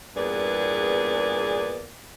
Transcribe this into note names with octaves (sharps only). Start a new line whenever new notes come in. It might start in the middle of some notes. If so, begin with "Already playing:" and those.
E2 G2 A#2 B3 G#4 D5